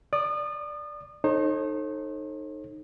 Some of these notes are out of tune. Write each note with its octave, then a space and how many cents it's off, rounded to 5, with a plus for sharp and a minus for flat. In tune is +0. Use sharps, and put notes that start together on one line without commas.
D5 +0 D#6 -35
D#4 -15 A4 +0 C5 +45